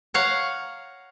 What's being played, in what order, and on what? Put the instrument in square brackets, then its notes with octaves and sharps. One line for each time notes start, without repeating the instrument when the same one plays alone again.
[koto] C#5 F5 F#5 A#5